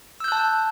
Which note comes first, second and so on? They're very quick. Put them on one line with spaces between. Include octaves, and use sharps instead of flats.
E6 G6 F#6 A5